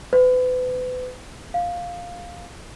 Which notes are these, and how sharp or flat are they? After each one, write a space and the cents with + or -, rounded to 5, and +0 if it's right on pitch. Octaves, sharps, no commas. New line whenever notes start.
B4 +35
F5 +5